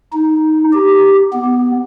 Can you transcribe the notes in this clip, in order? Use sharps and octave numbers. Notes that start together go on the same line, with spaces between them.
D#4
G4
B3